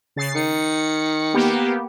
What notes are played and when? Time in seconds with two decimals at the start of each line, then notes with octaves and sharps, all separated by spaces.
0.16 C#3 A6 C7
0.35 D#3 C#7
1.34 A#3 B3 G4